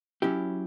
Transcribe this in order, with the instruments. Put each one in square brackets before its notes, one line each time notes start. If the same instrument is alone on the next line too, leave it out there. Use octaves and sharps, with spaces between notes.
[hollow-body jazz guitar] F#3 C#4 E4 G4